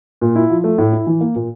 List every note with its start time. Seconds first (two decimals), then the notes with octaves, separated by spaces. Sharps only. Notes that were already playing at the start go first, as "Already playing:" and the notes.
0.21 A#2
0.36 E4
0.50 F3
0.64 A3
0.78 A2
0.93 E4
1.07 E3
1.21 A#3
1.35 A#2